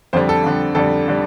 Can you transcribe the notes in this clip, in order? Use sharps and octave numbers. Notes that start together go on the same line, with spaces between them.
F2 D3 G3 C5
A4
F2 D3 G3
F2 D3 G3 A4
D3 G3